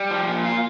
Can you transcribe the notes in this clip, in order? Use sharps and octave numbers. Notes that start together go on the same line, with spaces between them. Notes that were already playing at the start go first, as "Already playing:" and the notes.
Already playing: G3
F3
A#2
F4